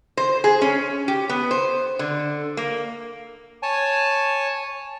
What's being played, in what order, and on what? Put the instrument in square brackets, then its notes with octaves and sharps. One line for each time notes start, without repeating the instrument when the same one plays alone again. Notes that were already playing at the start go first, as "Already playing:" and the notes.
[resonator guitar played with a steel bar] C5
G#4
C#4
G4
B3
C5
D3
A#3
[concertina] C#5 G#5 A5